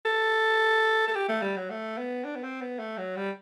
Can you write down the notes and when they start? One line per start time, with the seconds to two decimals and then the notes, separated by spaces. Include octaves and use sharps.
0.05 A4
1.08 A4
1.15 G4
1.28 A3
1.42 G3
1.57 F#3
1.70 A3
1.98 B3
2.24 D4
2.36 B3
2.44 C4
2.61 B3
2.79 A3
2.98 F#3
3.16 G3